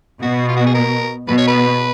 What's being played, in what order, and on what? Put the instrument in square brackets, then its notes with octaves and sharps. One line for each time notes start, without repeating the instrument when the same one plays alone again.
[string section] B2 [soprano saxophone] F#4
[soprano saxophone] F4
F#4
G#4
A#4
[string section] B2 [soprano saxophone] B4
[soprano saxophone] C#5
B4